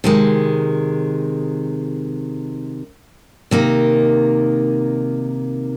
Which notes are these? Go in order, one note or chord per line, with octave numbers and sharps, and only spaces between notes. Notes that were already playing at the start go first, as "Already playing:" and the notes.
C3 D#3 G#3
C3 D#3 A#3 D#4